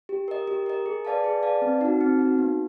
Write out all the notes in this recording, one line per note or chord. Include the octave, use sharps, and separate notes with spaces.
G4
A#4 D#5
G4
A#4 D#5
G#4
B4 D5 F5 A5
G#4
B4 D5 F5 A5
C4
D#4 F#4
C4
D#4 F#4
B3